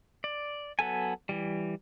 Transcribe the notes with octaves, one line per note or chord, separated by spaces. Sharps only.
D5
F#3 B3 A4 G#5
E3 G3